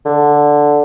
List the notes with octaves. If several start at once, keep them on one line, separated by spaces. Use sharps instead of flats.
D3